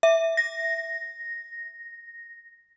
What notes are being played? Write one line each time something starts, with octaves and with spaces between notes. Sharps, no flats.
E5
A#6